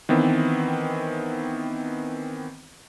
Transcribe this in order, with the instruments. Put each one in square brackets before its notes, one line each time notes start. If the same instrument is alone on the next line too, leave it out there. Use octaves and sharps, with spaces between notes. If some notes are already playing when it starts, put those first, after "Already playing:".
[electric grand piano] D#3 E3 B3 C4